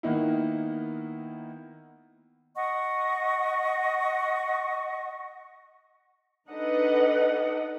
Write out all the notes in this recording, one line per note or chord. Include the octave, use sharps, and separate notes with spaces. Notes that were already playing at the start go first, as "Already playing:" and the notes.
D#3 A#3 B3 D#4 E4
D#5 F#5 C#6
D4 D#4 A4 B4 D#5 F#5